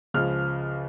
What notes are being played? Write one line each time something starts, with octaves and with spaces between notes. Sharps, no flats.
C#2 C#3 F3 F6